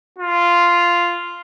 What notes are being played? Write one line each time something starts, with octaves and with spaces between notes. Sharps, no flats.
F4